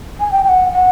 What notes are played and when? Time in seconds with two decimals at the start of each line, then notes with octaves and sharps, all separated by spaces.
0.20 G#5
0.32 G5
0.44 G5
0.49 F#5
0.72 F#5